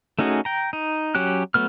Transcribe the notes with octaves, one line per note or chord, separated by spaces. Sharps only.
A3 C#4 D#4 F#4 G#4
G5 A#5
D#4
F#3 C#4 G4 F#6
F#3 A3 B3 F6